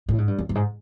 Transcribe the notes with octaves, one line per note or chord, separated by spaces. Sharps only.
A2
G#2
G2
F#2
G2
G#2